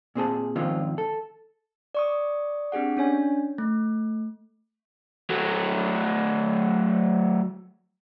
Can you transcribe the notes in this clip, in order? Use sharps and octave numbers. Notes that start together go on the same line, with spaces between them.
A#2 C4 G#4 A5
G#2 D#3 F3 C4 C#4 F4
A4
D5 C#6 D#6
C4 D4 G4 G#4 F#5
C#4 D4 C#5 G#5
A3
F#3 A3